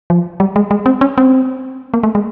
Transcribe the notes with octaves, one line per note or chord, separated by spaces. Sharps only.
F3
G3
G#3
G#3
C4
C#4
C4
A#3
A3
G#3